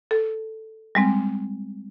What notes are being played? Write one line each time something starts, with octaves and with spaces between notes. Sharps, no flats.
A4
G3 G#3 C4